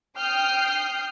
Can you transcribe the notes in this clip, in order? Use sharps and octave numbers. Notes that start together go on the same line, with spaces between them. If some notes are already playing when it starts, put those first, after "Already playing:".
G5 D#6 F6 G6 C7